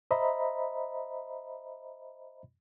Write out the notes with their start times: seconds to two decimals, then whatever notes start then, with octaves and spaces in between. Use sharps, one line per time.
0.11 C5 D#5 E5 A#5 B5